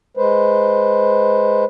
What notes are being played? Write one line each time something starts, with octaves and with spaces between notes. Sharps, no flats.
G#3 B4 C5